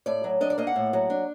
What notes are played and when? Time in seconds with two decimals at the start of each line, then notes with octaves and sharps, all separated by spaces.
0.06 A2 D5
0.24 F#3
0.41 D4 D#5
0.50 D5
0.58 A#3 D#5
0.67 F#5
0.76 A2
0.93 F#3
1.10 D4